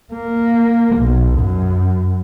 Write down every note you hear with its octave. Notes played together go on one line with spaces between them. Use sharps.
A#3
B1
F#2